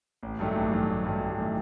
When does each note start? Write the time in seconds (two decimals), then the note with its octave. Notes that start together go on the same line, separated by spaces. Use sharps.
0.23 A1
0.39 G2 D#3 F#3 A3
0.55 A1
0.72 G2 D#3 F#3 A3
0.88 A1
1.05 G2 D#3 F#3 A3
1.20 A1
1.37 D#3 F#3 A3